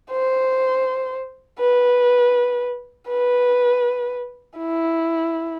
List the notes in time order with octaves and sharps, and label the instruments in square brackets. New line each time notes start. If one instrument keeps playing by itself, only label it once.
[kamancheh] C5
B4
B4
E4